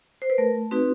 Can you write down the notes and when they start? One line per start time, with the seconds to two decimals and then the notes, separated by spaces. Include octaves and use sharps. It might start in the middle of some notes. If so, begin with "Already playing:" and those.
0.22 C5
0.30 B4
0.38 A3 A#4
0.71 C4 D#4 F#4 B4